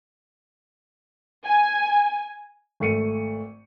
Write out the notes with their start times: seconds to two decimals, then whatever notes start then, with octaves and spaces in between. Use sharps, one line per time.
1.44 G#5
2.80 G#1 A3 C#7 D#7